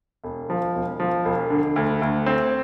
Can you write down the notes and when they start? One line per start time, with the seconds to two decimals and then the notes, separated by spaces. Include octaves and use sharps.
0.24 E1
0.50 F3
0.75 E1
1.00 F3
1.25 E1
1.50 D3
1.76 D2
2.02 D2
2.26 C4